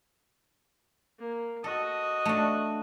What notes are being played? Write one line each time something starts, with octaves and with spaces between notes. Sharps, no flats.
A#3
F#4 A4 D#5
A3 D4